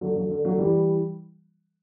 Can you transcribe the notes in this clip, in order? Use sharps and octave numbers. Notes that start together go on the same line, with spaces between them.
D3 F#3
D3 F#3
D3
D3 F#3
E3 G3